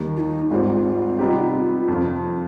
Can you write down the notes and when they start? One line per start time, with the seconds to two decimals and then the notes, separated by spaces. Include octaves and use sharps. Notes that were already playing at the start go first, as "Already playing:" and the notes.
Already playing: D#2 D#3 G3
0.17 F4
0.20 D#4
0.51 G#1 G#2 G3 C4 F4
1.19 C3 G3 B3 D#4 G4
1.88 F2 C3 F3